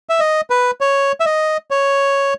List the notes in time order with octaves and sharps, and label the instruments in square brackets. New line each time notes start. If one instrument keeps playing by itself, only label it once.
[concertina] E5
D#5
B4
C#5
E5
D#5
C#5